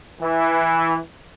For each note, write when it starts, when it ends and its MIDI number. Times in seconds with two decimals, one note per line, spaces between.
0.21 0.98 52